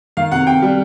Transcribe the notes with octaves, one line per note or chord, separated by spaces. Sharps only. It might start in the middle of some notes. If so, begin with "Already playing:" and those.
D#3 F5
C3 F#5
C3 G5
G3